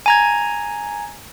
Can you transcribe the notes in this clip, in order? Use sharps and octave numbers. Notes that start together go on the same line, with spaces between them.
G#5 A#5 G#6